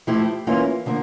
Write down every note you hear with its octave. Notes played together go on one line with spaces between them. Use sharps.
F3 A3 E4 G4
E3 A#3 C#4 F4
D3 F3 A#3